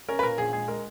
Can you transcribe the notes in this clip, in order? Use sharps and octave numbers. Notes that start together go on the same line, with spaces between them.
C#4 A#4
B4
A#2 A#4
A#1 G#4
G#3 G#4
G#3 A#4